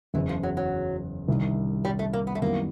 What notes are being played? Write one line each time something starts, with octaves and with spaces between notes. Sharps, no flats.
F#1 E2 C#3 E3
F3
F#3
F#3
C2 C3 D#3
G3
A3
A#3
B3
A3
F#2 D#3 G3 A#3 B3 E4